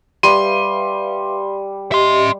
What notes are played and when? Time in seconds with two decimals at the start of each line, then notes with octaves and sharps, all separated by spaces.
0.23 G3 B4 E5 F5 C6 D#7
1.92 G4 D#5 E5 C6